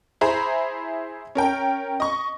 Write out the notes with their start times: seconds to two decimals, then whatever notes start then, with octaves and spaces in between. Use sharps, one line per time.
0.21 E4 G#4 C5 A#5 B5
1.35 C#4 A#4 G5
2.00 D#5 C#6